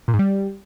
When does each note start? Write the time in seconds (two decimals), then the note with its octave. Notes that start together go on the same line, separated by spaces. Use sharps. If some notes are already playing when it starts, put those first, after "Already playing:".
0.08 A#2
0.14 G#2
0.19 G3